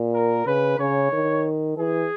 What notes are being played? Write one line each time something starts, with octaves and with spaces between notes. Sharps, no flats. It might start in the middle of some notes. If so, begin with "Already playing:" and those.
Already playing: A#2
A#4
C#3 B4
C#3 C#5
D#3
E3 G#4